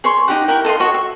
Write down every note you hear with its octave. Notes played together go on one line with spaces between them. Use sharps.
G#4 C#5 C6
D#4 F#4 G4 F#5
E4 A#4 F#5 G5
A4 D#5 F5 C6
F#4 C#5 D#5
E5